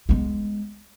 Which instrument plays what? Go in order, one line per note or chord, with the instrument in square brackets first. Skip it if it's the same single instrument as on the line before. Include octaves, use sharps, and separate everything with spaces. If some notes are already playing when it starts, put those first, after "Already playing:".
[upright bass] G#3 B3